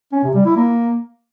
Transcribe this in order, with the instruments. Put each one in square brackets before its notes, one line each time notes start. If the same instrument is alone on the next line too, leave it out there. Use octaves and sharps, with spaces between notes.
[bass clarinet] C#4
C3
G3
E4
A#3